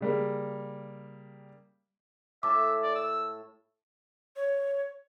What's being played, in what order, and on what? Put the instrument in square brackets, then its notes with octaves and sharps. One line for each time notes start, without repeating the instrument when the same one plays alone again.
[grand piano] C#3 G3 A#3
[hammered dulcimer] A2 A5 [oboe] E5 [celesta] D6
[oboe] D5
E6
[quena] C#5